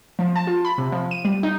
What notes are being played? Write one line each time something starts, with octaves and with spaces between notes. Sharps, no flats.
F3
A5
F4
B5
C3
F3
D#7
G3
D#4